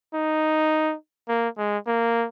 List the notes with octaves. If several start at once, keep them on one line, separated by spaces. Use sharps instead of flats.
D#4
A#3
G#3
A#3